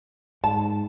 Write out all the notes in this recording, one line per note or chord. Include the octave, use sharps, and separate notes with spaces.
G#2 A5